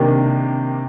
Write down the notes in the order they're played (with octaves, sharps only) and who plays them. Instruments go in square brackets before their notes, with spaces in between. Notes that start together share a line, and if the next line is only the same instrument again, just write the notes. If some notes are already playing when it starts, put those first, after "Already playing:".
Already playing: [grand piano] C3 D#3 A#3 D4 G4